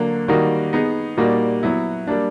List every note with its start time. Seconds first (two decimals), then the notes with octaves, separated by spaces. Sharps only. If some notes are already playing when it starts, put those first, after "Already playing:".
Already playing: D3 F#3 A#3
0.28 D#3 G3 A#3 D#4 F#4
0.73 B3 D#4 G#4
1.17 A#2 G3 A#3 D#4 F#4
1.63 F#3 B3 E4
2.07 G3 A#3 D4